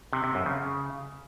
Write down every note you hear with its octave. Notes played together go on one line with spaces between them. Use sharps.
C3
C3
F#2
C#3